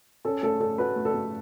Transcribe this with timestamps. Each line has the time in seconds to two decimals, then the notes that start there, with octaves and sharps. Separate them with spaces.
0.25 C#4 A4
0.43 A3 A4
0.60 C#4 A4
0.78 F#4 B4
0.96 A3
1.05 A4
1.14 A3